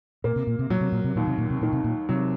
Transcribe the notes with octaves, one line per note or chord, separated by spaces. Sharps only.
A#2 A#3
C3
A#2
C3
A#2 F#3
C3
A#2
C3
D#2 A#2
C3
A#2
C3
A#2 D#3
C3
A#2
C3 F#3